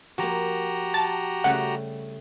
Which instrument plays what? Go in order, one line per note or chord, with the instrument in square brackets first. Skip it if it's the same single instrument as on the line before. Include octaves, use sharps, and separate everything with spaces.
[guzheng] F3 A#3 [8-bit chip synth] F#4 G4 A#5
[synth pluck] A5
[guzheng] C#3 G3 A3 [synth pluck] F#5